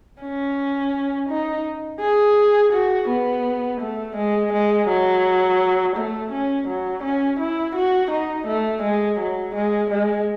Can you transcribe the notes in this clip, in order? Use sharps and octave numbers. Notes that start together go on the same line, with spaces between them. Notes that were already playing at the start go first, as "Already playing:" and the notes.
C#4
D#4
G#4
F#4
B3
A3
G#3
G#3
F#3
A3
C#4
F#3
C#4
E4
F#4
D#4
A3
G#3
F#3
G#3
G#3